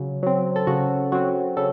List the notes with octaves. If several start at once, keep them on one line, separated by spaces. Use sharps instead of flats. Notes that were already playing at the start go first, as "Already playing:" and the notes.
Already playing: C#3 F#3
F#3 C4
A4
C#3 F#4
F#3 C4 F#4
C#3 A4